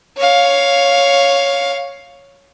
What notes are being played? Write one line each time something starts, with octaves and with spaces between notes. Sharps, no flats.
C#5 F5